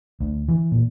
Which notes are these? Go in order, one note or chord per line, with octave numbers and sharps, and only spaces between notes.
D2
E3
A#2